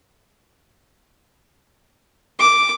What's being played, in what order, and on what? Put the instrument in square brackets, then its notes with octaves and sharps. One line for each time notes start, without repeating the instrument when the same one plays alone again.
[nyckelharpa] D6